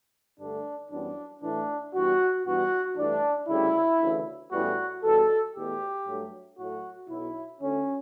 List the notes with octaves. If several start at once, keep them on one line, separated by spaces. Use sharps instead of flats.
G2 D3 A3 D4
F#2 E3 G3 B3 D4
A2 E3 A3 D4
G2 E3 G3 B3 F#4
G2 E3 G3 B3 F#4
G2 E3 A3 D4
D2 C#3 G3 E4
D2 C#3 E3
A1 A2 E3 G3 B3 F#4
E2 B2 G3 A4
E2 B2 A3 G4
G2 F#3 A3
A2 F#3 A3 F#4
B1 B2 F#3 E4
D2 D3 A3 C#4